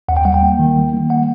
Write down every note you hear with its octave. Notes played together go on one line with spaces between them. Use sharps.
D#2 F#5
G5
G3 F#5
G5
A#3
D#3
G3
A#3
A#3 F#5